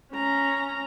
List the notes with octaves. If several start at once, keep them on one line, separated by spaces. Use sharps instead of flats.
C#4 A#5